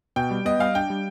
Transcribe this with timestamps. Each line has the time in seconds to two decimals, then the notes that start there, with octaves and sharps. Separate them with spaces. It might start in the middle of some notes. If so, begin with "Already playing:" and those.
0.16 B2 G5
0.31 G3
0.45 B3 D#5
0.59 G3 F5
0.75 D4 G5
0.90 G3